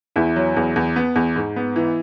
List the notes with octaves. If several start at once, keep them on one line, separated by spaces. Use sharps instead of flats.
E2 E4
F#3
E2
E2
B3
E2
G#2
B3
E3